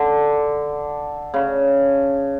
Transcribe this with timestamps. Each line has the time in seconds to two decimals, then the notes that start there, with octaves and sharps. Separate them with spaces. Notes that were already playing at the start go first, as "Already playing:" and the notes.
Already playing: D3
1.34 C#3